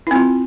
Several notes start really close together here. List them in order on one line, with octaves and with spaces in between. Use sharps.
E4 C4 F4